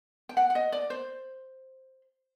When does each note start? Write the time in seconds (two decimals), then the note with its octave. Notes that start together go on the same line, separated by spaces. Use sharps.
0.29 G5
0.37 F#5
0.50 F#5
0.55 D#5
0.72 D5
0.90 C5